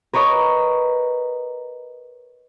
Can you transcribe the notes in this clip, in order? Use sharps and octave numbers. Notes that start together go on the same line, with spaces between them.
A#4 B4 C#5 D#5 A#5